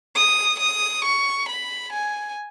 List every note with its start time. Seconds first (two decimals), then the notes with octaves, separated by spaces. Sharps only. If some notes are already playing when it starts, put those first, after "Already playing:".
0.16 D#6
0.60 D#6
1.05 C#6
1.49 B5
1.93 G#5